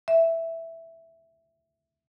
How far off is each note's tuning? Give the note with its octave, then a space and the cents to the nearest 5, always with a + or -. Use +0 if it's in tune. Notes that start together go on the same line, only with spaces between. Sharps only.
E5 +0